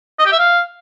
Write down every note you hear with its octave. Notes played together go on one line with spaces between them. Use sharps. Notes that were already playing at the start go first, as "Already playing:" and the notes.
D#5
G4
E5
F5